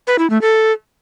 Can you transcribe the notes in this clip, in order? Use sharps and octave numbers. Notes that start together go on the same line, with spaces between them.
B4
E4
A3
A4